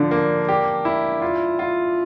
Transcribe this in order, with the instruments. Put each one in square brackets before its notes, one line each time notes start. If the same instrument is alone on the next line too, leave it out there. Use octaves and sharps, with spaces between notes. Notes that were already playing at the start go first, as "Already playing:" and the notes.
Already playing: [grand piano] D3 F3 [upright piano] D4
[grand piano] A#3
G4
E4
F4
F4